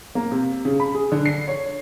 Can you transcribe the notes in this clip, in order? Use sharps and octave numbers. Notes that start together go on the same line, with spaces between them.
A#3
C3
C#3
B5
G#4
D3
C7
C#5